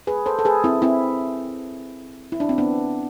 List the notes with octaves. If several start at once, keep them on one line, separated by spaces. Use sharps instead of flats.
G#4 B4
A4 C5
A4
G#4 B4
C4 E4
C4 E4
E4
D4
C4
B3 D4